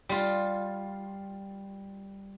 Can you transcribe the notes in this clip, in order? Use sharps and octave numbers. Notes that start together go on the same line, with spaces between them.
G3 F4